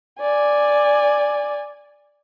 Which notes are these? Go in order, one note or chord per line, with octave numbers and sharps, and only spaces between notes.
D5 G#5